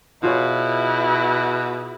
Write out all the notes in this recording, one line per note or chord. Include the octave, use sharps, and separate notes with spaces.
B2 E4 F4 G#4 C#5